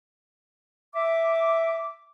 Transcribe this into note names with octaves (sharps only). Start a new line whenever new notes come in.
E5 D6